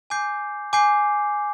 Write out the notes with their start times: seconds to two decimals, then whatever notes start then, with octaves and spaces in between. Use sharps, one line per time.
0.10 G#5 D6 G6 C7
0.73 G#5 D6 G6 C7